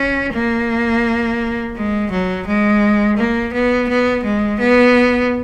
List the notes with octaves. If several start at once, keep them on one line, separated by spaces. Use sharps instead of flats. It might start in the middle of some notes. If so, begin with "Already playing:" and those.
Already playing: C#4
A#3
G#3
F#3
G#3
A#3
B3
B3
G#3
B3